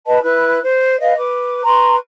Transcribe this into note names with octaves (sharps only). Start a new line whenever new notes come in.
B4 D#5 A5
E4 B4 F#6
C5
B4 D#5 F5
B4 D6
B4 A#5 C6 C#6